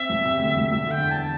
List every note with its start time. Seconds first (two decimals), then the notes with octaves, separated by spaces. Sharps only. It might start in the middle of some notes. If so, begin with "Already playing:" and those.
Already playing: C4 E5
0.09 E1
0.25 C3
0.39 D2
0.56 E1
0.70 E1 E5
0.87 D3 G5
1.02 E2
1.11 A5